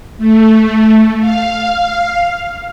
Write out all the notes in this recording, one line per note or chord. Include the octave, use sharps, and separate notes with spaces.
A3
F5